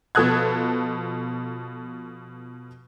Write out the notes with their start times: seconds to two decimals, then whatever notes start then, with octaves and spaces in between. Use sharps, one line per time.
0.15 B2 F3 A4 D#6 F#6 G#6